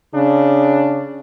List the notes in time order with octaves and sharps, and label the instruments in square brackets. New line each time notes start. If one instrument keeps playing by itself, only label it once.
[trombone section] C#3 D4